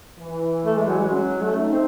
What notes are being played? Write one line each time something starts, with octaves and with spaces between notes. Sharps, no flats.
E3
A3
G#3
F#3
G#3
F#3 C#4
A3
D#4
C4